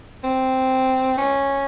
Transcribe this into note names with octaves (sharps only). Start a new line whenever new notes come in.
C4
C#4